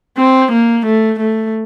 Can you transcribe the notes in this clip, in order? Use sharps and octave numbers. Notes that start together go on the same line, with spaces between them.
C4
A#3
A3
A3